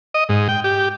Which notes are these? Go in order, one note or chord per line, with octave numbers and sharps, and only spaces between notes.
D#5
G#2
G5
G4